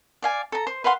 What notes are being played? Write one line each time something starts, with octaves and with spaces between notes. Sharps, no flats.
D5 F5 G#5
A4 A#5
C5
B4 F5 F#5 C6